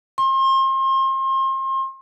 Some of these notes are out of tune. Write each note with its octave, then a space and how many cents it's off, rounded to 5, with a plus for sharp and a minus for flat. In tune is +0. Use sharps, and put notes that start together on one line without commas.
C6 +35